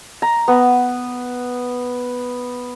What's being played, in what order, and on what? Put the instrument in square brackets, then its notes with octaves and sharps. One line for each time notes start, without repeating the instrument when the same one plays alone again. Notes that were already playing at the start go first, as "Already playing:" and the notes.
[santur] A#5
B3